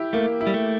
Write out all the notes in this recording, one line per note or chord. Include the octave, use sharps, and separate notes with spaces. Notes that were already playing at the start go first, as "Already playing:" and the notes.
Already playing: E4 G4
A3 A#3
E4
G3
A3